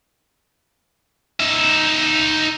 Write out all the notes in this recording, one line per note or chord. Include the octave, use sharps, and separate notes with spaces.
D#4 E5